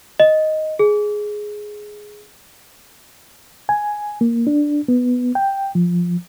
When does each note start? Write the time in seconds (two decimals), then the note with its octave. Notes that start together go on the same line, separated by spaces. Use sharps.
0.20 D#5
0.79 G#4
3.69 G#5
4.21 A#3
4.47 D4
4.88 B3
5.35 G5
5.75 F3